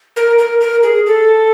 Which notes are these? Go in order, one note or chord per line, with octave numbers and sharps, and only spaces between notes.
A#4
A#4
A#4
G#4
A4